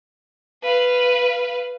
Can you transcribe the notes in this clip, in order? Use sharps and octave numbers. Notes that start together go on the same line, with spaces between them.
B4 F5